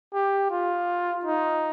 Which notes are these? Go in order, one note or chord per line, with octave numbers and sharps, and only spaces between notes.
G4
F4
D#4